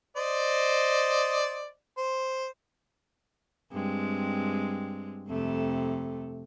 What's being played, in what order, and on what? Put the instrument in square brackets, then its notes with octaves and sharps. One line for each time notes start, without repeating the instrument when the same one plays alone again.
[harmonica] C5 D5 D#5
C5
[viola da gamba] G2 G#3 C4
F2 C3 A3